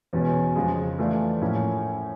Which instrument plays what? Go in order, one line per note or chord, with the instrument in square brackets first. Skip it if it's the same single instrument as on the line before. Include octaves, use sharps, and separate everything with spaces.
[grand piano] E2 B2 G#3 C#4
F2 C#3 F3 G#3
E3 A3 D4 F4
A2 F3 A#3 C#4 E4